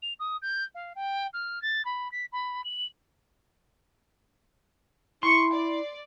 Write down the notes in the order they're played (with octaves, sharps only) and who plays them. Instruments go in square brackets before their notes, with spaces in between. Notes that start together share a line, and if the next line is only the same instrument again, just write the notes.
[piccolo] F7
D#6
G6
F5
G5
F6
A6
B5
B6
B5
F#7
[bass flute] E4 [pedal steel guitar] C6 [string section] C#6
[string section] D5